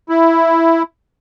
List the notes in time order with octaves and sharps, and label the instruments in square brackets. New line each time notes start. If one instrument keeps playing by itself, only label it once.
[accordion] E4